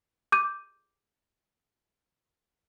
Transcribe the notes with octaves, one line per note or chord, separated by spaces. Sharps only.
D6 G6 D#7